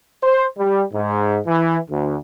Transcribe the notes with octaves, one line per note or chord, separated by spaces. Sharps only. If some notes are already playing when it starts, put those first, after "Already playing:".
C5
G3
G#2
E3
D2